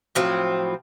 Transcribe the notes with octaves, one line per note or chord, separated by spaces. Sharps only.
A2 F3 F#3 C4